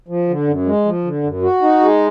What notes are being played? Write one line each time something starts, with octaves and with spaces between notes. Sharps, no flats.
F3
D3
F#2
G#3
F3
D3
F#2
F#4
D#4
G#3